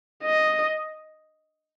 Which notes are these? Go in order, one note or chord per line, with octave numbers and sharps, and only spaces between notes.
D#5